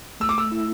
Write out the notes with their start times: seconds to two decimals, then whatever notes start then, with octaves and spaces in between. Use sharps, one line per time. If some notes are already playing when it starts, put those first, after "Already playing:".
0.20 A3 E6
0.29 D6
0.38 E6
0.52 E4